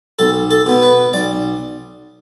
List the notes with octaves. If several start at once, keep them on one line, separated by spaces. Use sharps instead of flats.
B1 A4
A4
B2 B3
B4
B1 D5